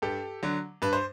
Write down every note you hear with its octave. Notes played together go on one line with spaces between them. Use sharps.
G2 G4 A4
D3 F#3
G2 B4
C5